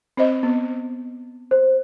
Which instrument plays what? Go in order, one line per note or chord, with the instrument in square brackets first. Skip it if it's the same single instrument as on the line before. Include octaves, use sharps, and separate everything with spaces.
[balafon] C4 C5 D#5
B3
[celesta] C5